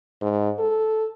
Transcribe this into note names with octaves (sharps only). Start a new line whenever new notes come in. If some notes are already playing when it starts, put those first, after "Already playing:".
G#2
A4